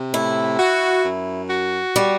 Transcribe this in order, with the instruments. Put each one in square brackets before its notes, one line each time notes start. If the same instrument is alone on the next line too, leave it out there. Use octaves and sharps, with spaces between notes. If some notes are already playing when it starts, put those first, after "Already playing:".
Already playing: [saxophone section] C3
[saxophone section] A2 [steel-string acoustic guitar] E4
[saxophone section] F#4
F#2
F#4
[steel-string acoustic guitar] G3